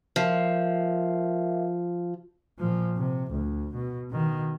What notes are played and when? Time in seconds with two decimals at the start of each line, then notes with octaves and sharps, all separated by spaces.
0.16 F3 A#4 E5 F5
2.59 A#2 F3
2.97 C3
3.31 D2
3.75 B2
4.11 B2 D#3